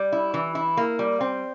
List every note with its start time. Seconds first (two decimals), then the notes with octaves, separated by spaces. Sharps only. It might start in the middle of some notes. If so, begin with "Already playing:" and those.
Already playing: G3
0.12 E4
0.34 E3
0.55 E4
0.77 A#3
0.99 G3
1.21 C4